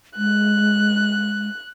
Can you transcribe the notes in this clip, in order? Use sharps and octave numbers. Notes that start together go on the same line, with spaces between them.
G#3 F#6